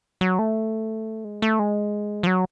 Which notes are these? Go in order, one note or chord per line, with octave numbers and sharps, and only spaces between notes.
F#3
A3
G#3
A3
G#3
F3
F#3